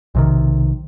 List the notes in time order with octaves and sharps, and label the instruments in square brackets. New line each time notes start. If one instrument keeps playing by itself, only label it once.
[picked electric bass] B1 C3 D#3